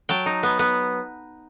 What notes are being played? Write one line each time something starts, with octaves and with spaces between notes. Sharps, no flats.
F#3 G5 A5
D#4
B3
B3